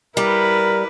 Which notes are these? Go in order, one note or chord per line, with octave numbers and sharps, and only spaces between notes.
G3 E4 A#4 B4